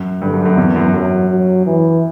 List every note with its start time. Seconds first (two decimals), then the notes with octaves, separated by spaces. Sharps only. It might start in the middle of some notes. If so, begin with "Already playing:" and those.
Already playing: F#2
0.22 G2 D3
0.34 F#2
0.45 F#2
0.57 E2 E3
0.76 F#2
0.94 F#2 F#3
1.30 F#3
1.66 E3